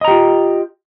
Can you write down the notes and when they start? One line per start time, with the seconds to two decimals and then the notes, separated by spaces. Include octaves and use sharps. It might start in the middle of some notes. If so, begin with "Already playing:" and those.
0.01 D#5
0.05 A#5
0.08 G4
0.11 F4